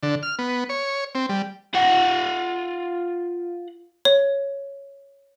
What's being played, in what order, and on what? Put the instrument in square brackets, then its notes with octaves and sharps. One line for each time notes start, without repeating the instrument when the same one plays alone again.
[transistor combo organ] D3
F6
B3
C#5
C4
G3
[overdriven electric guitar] F4 F#5
[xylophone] C#5